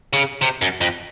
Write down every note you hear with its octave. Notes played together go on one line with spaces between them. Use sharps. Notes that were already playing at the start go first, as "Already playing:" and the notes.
C#3
C3
F#2
F2